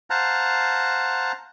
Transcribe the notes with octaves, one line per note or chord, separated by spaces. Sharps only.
C5 F5 F#5 A5 A#5